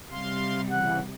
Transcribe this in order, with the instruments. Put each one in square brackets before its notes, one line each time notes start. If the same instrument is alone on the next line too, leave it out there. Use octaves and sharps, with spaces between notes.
[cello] C3 G3 [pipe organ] F5 C6
[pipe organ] C#3 E3 [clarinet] F#5